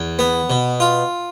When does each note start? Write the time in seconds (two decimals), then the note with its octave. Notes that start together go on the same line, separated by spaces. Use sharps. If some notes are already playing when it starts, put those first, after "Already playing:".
Already playing: E2
0.19 B3
0.50 B2
0.80 F4